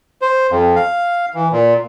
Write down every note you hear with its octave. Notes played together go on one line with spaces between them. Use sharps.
C5
F2
F5
E3
A#2